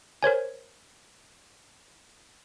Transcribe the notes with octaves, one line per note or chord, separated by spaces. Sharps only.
A#4 C5 C#5 G#5